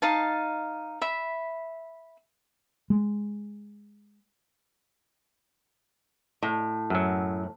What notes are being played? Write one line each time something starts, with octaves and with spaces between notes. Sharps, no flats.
D#4 F5 A5
E5 B5
G#3
A2
F#2 F#3